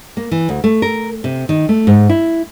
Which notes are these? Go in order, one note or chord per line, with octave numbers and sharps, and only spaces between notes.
A#3
E3
D2
A3
A#4
C3
D#3
A3
G#2
E4